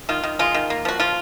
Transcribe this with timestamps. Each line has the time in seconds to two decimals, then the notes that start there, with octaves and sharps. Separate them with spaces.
0.09 D#3 F4
0.24 D#3
0.39 G#3 F4
0.55 D#3
0.70 A#3
0.85 F3 F#4
1.00 F3 F4